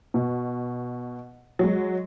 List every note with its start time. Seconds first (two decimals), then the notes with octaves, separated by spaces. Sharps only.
0.14 B2
1.59 F#3 G#3